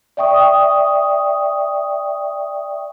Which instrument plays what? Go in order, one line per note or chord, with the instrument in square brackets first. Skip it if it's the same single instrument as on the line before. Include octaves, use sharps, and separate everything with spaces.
[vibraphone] D5 E5 G5 C#6 D#6